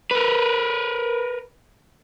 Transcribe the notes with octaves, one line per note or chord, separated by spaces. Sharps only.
A#4 B4